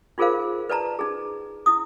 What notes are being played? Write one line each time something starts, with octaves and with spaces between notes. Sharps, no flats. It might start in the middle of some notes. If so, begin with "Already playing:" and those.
D#4 F4 G#4 A#4 C5 F5
B4 D5 A5 A#5
D#4 G#4
E4 D#6